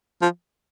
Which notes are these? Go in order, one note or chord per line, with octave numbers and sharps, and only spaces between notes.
F3